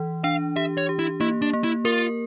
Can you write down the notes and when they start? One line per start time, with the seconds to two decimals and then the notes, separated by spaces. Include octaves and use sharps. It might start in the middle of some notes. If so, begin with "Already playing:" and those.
Already playing: E3
0.24 D4 F5
0.56 G4 E5
0.77 C#5
0.89 G4
0.99 E4
1.20 A#3 E4
1.42 D4
1.53 A#3
1.64 E4
1.85 F4 A#4